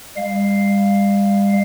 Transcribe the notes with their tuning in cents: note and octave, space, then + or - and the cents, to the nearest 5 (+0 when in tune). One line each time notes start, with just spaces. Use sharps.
G3 +40 F5 +0